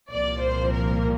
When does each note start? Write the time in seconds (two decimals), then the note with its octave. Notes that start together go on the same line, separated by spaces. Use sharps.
0.11 C2 A#2 F3 A#3 D5
0.41 C5
0.71 A#4